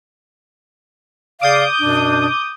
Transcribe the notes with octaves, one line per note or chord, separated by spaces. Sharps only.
C#3 D5 F5 D6 D#6 G6
F#2 B2 D4